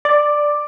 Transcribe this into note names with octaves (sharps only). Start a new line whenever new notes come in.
D5